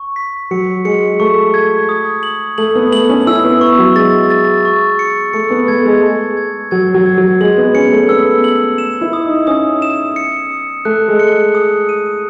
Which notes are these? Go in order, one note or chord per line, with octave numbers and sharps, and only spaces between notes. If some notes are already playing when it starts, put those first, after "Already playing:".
Already playing: C#6
B6
F#3 C#7
G#3 C#7
A3 C#6
G#6
D#6
F#7
A3 F#7
B3
A3 F#7
C#4
E4 E6
B3
C#6
F#3
G#3 A6
A6
C#6
C#7
A3 C#7
B3
A3 G#6
G#3
A5
G#6
F#3 G#6
F#3
G#6
F#3
G#3 F#7
B3
C#4 C#7
A3
B3 E6
F#7
E7
E4
D#6
D#4
C#4 D#6
E7
C#7
D#6
A3 F#6
G#3
C#7
D#6
D#7